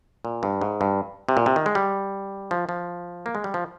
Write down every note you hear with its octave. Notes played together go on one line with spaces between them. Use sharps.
A#2
G2
G#2
G2
C3
A#2
C3
D#3
G#3
G3
F3
F3
A#3
G#3
G3
F3